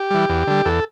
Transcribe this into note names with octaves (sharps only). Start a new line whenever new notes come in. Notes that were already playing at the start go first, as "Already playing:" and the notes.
Already playing: G4
E3 G3
E2
D3 G3
E2 A4